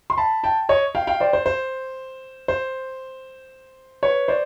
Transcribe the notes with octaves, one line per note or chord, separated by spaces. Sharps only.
C6
A5 B5
G5 A5
C#5 D#5
F5 G5
F5 G5
C5 D5
C5
C5
C5
B4 C#5
C5 D5